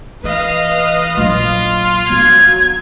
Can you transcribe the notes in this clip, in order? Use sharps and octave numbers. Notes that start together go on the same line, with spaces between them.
E3 B4 D#5 F5
A#1 F#3 F4
D3 F#3 B3 G#6